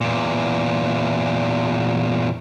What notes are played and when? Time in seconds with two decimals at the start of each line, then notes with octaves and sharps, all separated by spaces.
0.01 E2 A#2